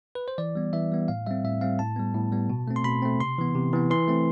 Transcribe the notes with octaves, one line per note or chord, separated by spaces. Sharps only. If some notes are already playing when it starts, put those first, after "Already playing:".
B4
C5
E3 D5
G3 B3
E3 E5
G3 B3
A2 F5
G3 C4 E5
A2 E5
G3 C4 F5
A2 A5
G3 B3
A2
G3 B3
B2
A3 C4
C6
B2 B5
A3 C4
C3 C6
E3 B3
C3
E3 B3
E3 C6
A3 C4